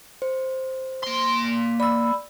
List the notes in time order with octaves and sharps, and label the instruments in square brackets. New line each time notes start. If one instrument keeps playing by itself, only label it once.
[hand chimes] C5
[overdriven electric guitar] A#3 C6
[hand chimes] D5 [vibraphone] B5 E6